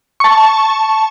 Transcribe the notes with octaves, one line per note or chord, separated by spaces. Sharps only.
A5 C#6